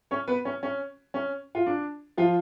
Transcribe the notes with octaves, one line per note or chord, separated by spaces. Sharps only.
C#4 C#5
B3 B4
C#4
C#4
C#4
F4
D4
F3 F4